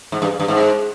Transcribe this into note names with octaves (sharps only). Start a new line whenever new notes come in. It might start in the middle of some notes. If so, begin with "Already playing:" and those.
G#2
G2
G2
G#2